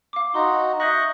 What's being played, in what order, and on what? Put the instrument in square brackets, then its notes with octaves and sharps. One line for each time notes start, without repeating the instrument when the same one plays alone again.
[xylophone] F5 D6
[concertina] D#4 F#4 [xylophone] C6
[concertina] D#5 C#6 F#6 [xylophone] E5 G6 A#6